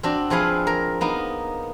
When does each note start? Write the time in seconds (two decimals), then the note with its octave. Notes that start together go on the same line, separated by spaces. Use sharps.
0.03 C4 D4 F#4
0.30 F3 C4 G#4 B4 F5 F#5
0.67 A#4
1.01 A#3 B3 D#4